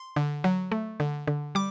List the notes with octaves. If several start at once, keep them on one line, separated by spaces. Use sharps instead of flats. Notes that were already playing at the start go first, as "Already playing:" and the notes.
Already playing: C6
D3
F#3
A3
D3
D3
G3 D6